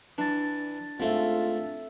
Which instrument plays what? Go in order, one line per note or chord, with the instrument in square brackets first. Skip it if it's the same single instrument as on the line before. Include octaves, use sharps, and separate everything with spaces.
[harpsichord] E3 [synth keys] D4 A6
[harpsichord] G#2 A3 [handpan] C4 A4 E5 [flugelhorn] F4